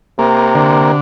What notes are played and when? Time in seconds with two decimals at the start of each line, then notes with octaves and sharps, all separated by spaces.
0.19 C3 A#3
0.55 D3